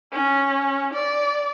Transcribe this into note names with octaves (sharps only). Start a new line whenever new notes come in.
C#4
D5